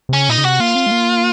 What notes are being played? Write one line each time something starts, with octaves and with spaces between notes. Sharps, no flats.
C3
C#3 C#4
A#2 D#4
C#3
C3 F#4
A#3 F4
C4
G#3
A#3